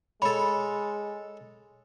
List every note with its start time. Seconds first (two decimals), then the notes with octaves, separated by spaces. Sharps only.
0.22 G#3 A4 C#5 B5